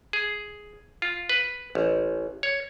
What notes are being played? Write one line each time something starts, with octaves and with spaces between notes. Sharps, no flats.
G#4
F4
B4
A1
C#5